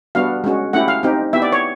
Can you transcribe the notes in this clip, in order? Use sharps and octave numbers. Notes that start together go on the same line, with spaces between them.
G3 B3 D4 F#4 F5
G#3 C#4 F#4
A3 C#4 E4 G4 F#5
F5
C4 D#4 G4
B3 E4 G4 E5
D5
C#5